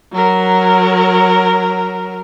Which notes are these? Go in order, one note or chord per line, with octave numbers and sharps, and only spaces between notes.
F#3 A#4